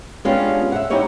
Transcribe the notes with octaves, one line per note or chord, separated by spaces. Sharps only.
G#3 B3 C#4 D4 F4 G4
E5 F#5
D#4 E4 G4 C#5 D#5